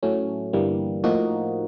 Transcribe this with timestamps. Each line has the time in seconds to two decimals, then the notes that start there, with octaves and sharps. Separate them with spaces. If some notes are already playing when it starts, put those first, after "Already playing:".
0.03 A2 F#3 A3 C#4
0.53 G1 G2 E3 G3 A#3
1.03 A2 F3 A#3 D#4 F#4